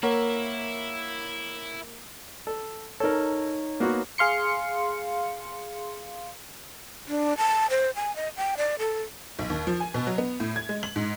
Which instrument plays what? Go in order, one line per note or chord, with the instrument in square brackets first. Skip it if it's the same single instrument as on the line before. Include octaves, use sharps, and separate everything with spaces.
[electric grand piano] A#3 [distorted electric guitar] E4 E5 [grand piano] A#4 [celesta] C#5 F#5 C#6
[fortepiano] A4
[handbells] D#4 C#5 [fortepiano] A4 A#4
[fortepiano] A#3 B3 F#4
[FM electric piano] G#4 F5 C6 C#7
[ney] D4
A5
C5
G#5
D#5
G5
D5
A4
[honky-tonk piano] B1
D#2
F3
G#5
B2
F#3
B3
A2
G#6
G#3
F#7
G#2